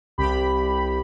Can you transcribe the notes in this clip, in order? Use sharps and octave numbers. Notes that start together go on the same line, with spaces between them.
C2 G4 B5